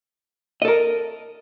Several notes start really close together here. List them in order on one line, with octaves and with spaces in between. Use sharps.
D#5 A4 A#4